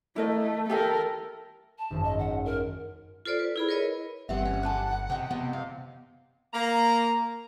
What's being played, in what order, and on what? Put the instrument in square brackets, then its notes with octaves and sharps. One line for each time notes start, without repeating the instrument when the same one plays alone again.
[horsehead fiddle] A3 [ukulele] E4 A#4 D#5
[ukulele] G4 E5 G#5 [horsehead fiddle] A4 A#4
[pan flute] A5
[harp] G#1 F#2 G#3
[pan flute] D#5
F#5
A#4
[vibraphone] F4 A4 C5 D5
B4
E4 G#4 B5
A#4 B4 C#5 D#5
[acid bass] G1 [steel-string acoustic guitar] G3 B3 C4 [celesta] G4 E5 [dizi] F#5
[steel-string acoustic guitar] C#4
[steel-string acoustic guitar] D4 G4 A4 [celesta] G#5 A5 F#6
[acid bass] C3 [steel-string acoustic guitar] D#5 G5
[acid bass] C3 [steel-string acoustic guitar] B3 D#5 G5
[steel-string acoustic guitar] F5
[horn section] A#3 A#5